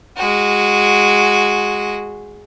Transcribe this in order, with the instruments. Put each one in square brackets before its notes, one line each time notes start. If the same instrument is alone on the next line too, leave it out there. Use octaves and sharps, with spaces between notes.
[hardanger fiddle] G#3 F#4